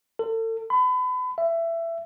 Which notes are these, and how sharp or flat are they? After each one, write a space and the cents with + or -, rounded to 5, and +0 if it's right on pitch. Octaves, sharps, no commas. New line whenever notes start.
A4 +35
B5 +35
E5 +20